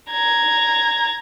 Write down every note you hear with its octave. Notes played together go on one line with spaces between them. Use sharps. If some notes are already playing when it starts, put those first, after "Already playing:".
A#5 G#6